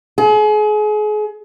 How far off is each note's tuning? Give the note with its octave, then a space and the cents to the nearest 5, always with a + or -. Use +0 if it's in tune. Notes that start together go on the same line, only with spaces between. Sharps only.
G#4 +35